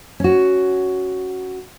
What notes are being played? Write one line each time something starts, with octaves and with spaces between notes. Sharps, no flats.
C#4 F#4